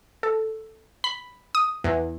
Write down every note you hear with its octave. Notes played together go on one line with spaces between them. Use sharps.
A4
B5
D#6
E2